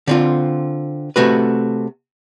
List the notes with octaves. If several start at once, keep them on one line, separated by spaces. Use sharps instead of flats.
D3 C4 F4
C3 A3 F#4 B4